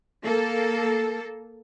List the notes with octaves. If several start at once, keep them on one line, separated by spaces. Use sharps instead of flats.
A#3 A4